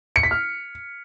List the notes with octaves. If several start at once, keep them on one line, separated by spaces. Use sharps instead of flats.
C#7
B6
F6